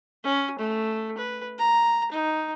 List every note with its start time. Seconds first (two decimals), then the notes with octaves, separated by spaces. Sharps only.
0.24 C#4
0.59 A3
1.18 B4
1.58 A#5
2.11 D#4